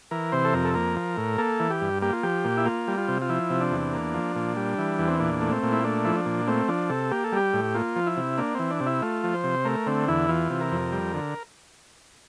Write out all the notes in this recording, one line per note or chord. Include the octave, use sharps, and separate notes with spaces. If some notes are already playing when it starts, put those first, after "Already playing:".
E3 A#4
C3 C5
A4
F2 A#4
A4
A#3 A#4
F3
A2
A#3 A4
E3
G4
G2
A#3 G4
F4
F3 G4
A#2
E4
A#3 F4
G3
F4
C3
F4
F3 E4
C3
D4
E2
A#3
F3
A#2
G3
E3
E2
C4
A#2 D4
A3
C4
A#2
E4
A3 D4
F3 E4
D4
A#2
A3 C4
F3 D4
C3 A4
A#3 G4
A4
G3 G4
A2
A#3 F4
F3
E4
C3
A#3 D4
E3 C4
D4
C3
E4
A3 F4
F3
C5
C3
A3 A#4
D3 C4
E2 E4
E3 F4
C3
A#4
F2
G3
D3